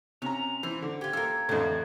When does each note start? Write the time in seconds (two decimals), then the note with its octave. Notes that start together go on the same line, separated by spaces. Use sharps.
0.22 C3 C#4 A#5 F7
0.63 E3 C5
0.82 D3 D6
1.01 F4 G4 G#6
1.13 A#3 F4 A4
1.49 F2 A2 D3 E3